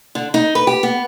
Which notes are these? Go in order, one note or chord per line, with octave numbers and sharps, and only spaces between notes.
D3
D#4
B4
G4
B3